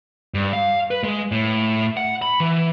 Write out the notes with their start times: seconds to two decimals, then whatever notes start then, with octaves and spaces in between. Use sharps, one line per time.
0.34 G2
0.53 F5
0.91 B4
1.04 G#3
1.32 A2
1.97 F#5
2.22 B5
2.40 E3